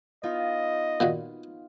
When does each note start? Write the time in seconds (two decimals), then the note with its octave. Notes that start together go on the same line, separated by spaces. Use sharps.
0.23 B3 D#4 F4 D#5
1.00 A#2 D#3 F#4